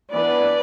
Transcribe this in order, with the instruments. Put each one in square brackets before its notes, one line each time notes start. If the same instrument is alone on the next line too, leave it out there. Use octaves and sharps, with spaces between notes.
[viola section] E3 B3 D4 B4 D5